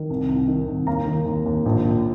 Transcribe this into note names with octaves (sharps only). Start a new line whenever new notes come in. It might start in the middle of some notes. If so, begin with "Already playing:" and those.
Already playing: D#3
C2
C2
D#3
C2
D#2 F5 A#5
D#3
D#2
D#2
A#1
A#2